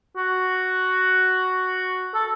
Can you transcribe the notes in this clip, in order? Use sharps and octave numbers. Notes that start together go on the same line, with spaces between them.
F#4
A4